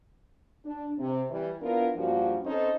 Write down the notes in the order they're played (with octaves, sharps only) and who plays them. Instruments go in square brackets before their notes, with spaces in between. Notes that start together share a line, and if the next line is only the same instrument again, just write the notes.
[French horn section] D4
C3
E3 G3
B3 D4 E4 F4 A#4
G2 F3 G3 A#3 C#4 F#4
C4 C#4 D#4 A4 C5